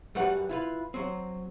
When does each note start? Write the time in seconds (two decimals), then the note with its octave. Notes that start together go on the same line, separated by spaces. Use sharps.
0.15 F#2 G3 F#4 B4 F#5
0.49 E4 F4 B4
0.94 F#3 C4